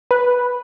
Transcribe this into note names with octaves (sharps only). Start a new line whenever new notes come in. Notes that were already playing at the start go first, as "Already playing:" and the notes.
B4